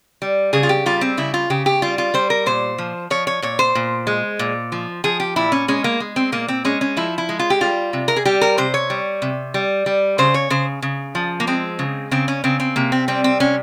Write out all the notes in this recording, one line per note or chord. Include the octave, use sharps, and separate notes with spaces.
G3
C#3 G#4
F4
G4
G3 F4
C4
C#3 E4
F4
C#3 G4
G4
G3 F4
F4
G3 C5
A#4
A#2 C5
F3
F3 C#5
C#5
A#2 C#5
C5
A#2
G#3
A#2
F3
F3 G#4
G4
A#2 E4
C#4
G#3 C#4
A#3
G#3
C4
A#2 A#3
C4
G#3 C#4
C#4
F3 E4
E4
G#3
F4
G4
G3 F4
C3
A#4
G#4
G3 G4
A#4
C3 C5
C#5
G3
C3
G3
G3
C#3 C5
C#5
C#3 C5
C#3
F3
A#3
G#3 C4
C#3
C#3 C4
C#4
C#3 C4
C4
C3 A#3
C4
G3 C4
C4
C3 C#4